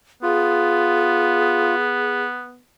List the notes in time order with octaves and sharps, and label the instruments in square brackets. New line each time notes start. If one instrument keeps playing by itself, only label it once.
[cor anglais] B3 [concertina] F4 [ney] G#4